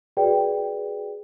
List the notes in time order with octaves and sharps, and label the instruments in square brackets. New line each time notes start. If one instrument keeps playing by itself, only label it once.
[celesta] F#4 G#4 B4 D5 G5